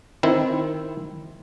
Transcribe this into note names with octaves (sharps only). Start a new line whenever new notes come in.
D#3 C4 E4